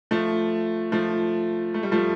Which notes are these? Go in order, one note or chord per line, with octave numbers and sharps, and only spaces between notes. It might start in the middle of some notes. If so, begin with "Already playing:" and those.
F3 A3
F3 A3
A3
G3
F3 A3